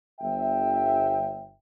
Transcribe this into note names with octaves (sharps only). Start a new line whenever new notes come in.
G1 E5 G5